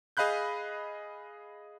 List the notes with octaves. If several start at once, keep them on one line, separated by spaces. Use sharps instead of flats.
G#4 D#5 F5 B5 F#6 G6